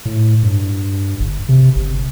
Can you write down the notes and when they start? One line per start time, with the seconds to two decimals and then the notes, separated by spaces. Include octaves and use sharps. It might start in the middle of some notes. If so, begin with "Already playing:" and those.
0.05 A2
0.43 G2
1.20 G1
1.49 C3
1.76 G1